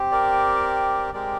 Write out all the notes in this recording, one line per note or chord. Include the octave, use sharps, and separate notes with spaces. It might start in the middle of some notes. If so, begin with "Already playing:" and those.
Already playing: C4 G4
A#4 D5
G#3 C4 G4 A#4 D5